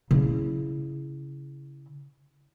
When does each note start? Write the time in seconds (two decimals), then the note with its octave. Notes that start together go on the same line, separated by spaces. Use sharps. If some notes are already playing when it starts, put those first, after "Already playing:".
0.11 C#3 E4